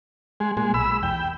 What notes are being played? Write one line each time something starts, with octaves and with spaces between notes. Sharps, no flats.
G#3
A#2 G#3
B1 B5 E6
E2 G5